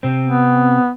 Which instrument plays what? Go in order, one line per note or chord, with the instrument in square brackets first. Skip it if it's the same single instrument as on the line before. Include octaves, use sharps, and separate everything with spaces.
[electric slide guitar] C3 C4
[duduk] B3